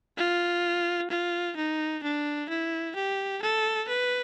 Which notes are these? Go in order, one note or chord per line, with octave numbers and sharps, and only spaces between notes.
F4
F4
D#4
D4
E4
G4
A4
B4